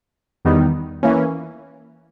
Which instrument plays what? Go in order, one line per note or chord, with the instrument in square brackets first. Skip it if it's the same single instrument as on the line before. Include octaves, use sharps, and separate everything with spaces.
[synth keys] E2 D#3 G3 B3 D#4
E3 A#3 C#4